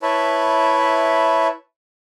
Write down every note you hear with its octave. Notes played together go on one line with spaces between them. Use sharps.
E4 B4 C#5 E5 A5 B5